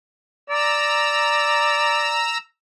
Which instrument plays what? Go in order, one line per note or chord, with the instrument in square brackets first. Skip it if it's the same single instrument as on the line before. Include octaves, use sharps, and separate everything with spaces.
[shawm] D5 [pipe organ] A#5 E6